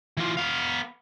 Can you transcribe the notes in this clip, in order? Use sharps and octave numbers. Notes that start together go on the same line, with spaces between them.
E3 F4
B3 F5